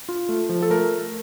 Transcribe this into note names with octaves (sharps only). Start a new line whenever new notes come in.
F4
A3
F3
A4
A3 A#4